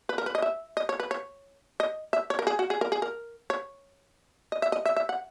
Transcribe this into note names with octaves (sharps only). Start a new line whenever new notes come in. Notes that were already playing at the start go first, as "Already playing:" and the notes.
B4
A#4
B4
D#5
E5
D#5
C#5
B4
C#5
D#5
E5
C#5
A#4
G#4
F#4
G#4
A#4
G#4
A#4
C#5
D#5
E5
D#5
E5
E5
F#5